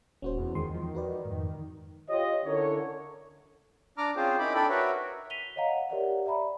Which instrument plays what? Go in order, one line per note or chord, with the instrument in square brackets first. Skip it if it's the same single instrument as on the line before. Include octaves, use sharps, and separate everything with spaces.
[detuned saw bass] D#1 [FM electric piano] C#4 F#4 C5
[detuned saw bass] E2
[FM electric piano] E2 G#3 C6 [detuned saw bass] D#3
[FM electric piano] E2 F3
F#4 B4 D5
F2 G#2
[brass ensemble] F4 G4 C#5 D#5
D3 C#4 E4 A#4 C#5
[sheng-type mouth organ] D4 A#5 D6 F6
C4 C#4 F4 G#4 C5
D#4 E4 A#4 B5 D6
D4 A4 D5 G5 B5
F#4 A#4 B4 C#5 E5
[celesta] B6 D#7 F7 G7
C#5 D#5 F5 F#5 A#5
G4 A#4 C#5 D5 E5 F#5
D5 E5 A#5 B5